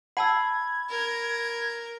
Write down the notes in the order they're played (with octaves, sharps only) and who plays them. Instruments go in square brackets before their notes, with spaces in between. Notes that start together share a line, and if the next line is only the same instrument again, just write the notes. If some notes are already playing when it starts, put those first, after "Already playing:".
[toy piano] F#5 A5 E6 [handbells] B5 [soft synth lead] G#6
[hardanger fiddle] A#4